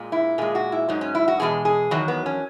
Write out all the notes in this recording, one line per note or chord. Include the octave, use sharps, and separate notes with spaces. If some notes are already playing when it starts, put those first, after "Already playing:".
Already playing: A#2 G#3
E4
A#2 G#3 G#4
F#4
E4
G#2 F#3 D#4
C#4
E4
F#4
E2 B2 G#3 G#4
G#4
E2 D#3 F#3 F#4
B3
C#4